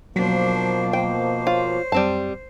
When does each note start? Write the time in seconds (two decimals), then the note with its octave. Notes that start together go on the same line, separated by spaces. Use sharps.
0.16 B2 F3 F#3 A#3 D4 C5
0.93 C5 G5
1.47 F4 C#5 C6
1.92 F#2 G3 C4 A5